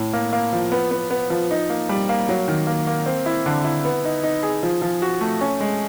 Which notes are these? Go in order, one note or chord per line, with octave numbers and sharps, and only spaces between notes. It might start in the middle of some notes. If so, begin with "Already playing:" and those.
Already playing: A2
A#3
A#3
F3
B3
B3
B3
F3
D#4
A#3
G3
A#3
F#3
D#3
A#3
A#3
C4
E4
D3
E4
B3
D#4
D#4
G#4
F3
F3
F#4
A3
C#4
G#3